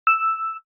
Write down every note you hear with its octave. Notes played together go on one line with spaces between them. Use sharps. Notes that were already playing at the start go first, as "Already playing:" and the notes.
E6